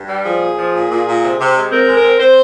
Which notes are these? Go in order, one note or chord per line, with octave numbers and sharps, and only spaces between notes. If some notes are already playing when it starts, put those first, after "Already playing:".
Already playing: G2
G3
F3 G#4
A#2
F3
A#2
A#2
A#2
C3
C3
G#3
C4 A#4
G#3
A#4
C4
C4 C5